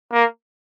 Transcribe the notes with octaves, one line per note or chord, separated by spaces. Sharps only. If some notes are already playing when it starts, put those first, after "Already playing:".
A#3